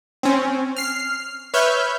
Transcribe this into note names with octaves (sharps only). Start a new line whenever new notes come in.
C4 C#4
F6 C7
B4 C#5 E5 F6 G6